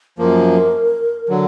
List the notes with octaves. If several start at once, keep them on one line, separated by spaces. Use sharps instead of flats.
F#2 F3 A#3 A#4
D3 F#3